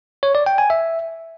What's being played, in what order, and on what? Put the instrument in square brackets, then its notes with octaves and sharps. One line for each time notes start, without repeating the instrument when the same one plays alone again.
[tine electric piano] C#5
D5
G5
G#5
E5